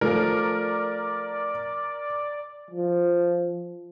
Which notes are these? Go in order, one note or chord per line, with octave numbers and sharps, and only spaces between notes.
F3 A3 A#4 D5
F3